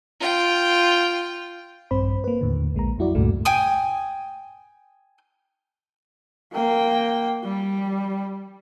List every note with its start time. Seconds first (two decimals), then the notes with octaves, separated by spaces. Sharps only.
0.20 F4 G5
1.91 A#1 G2 C4 C5 B5
2.24 A#3 B4
2.41 D#2 A2 D3
2.75 A#1 G#3 A#3 A#5
2.98 F2 F#3 E4 F#4 D5
3.15 C#2 G2 A#2 C#3 G#3 A3
3.45 G5 G#5 D#6
6.53 A#3 G5
7.44 G3